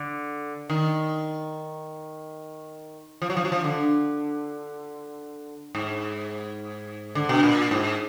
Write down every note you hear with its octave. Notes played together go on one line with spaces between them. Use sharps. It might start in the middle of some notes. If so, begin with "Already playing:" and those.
Already playing: D3
D#3
F3
F#3
F3
F#3
F3
D3
G#2
D3
B2
A#2
G#2